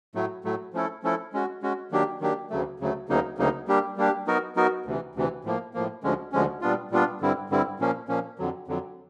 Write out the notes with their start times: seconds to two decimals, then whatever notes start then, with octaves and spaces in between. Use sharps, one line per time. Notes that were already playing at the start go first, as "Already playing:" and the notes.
0.15 A2 F#3 A3
0.45 A2 F#3 A3
0.74 F3 A3 C#4 E4 A4
1.03 F3 A3 C#4 E4 A4
1.33 G#3 C#4 F#4
1.62 G#3 C#4 F#4
1.92 D#3 F#3 A#3 D4 G4
2.21 D#3 F#3 A#3 D4 G4
2.50 D2 C#3 F#3 A3
2.80 D2 C#3 F#3 A3
3.09 D2 C#3 F#3 A#3 D#4
3.38 D2 C#3 F#3 A#3 D#4
3.68 G3 A#3 D4 G4
3.97 G3 A#3 D4 G4
4.27 F#3 B3 D#4 F#4 A#4
4.56 F#3 B3 D#4 F#4 A#4
4.86 D2 C3 E3
5.15 D2 C3 E3
5.45 A2 F3 A#3
5.74 A2 F3 A#3
6.04 D2 D3 F3 G#3 C#4
6.32 D2 D3 F3 G#3 C#4
6.62 A#2 G3 B3 D4 F4
6.91 A#2 G3 B3 D4 F4
7.21 G2 D3 G3 C4 E4
7.50 G2 D3 G3 C4 E4
7.80 A#2 F3 A#3 C#4
8.09 A#2 F3 A#3 C#4
8.39 F2 D3 F#3
8.68 F2 D3 F#3